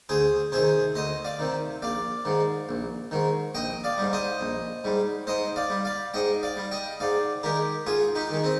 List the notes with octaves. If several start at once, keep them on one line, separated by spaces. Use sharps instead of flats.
D2 G#4 C5
C3 D#3 G#4 C5
D2 C5 D#5
D5 F5
C3 D#3
A#1 D5 F5
G#2 D#3
A#1
G#2 D#3
A#1 D#5 G5
D5 F5
G#2 G3
C5 D#5
A#1
G#2 G3
G#2 C5 D#5
D5 F5
G3
D5 F5
G#2 D#5 G5
D5 F5
G3
D#5 G5
G#2 D5 F5
D#3 G#3 G4 A#4
G#2 F4 G#4
D#4 G4
D#3 G#3
C4 D#4